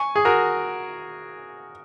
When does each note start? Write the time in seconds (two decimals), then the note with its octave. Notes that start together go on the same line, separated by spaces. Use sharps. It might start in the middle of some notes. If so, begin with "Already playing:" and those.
Already playing: G#5 C#6
0.16 G#4
0.25 F#4 A#4